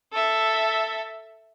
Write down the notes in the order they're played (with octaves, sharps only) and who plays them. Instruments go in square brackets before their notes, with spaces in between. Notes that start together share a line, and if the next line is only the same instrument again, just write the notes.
[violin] A4 E5